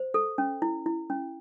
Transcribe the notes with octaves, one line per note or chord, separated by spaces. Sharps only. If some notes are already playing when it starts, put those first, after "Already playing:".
Already playing: C5
A4
C#4
E4
E4
C#4